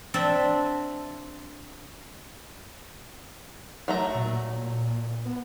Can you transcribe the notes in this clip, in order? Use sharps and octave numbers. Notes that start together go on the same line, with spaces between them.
C4 D4 D5 E5
F#3 A3 A#5
A#2
B3